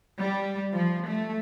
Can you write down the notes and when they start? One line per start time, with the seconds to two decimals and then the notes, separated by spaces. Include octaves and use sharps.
0.20 G3
0.73 F3
1.08 A3